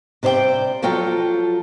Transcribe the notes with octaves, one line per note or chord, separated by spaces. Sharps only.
C3 G3 C5 C#5 G5
F3 F#3 F4 A4 G5 A#5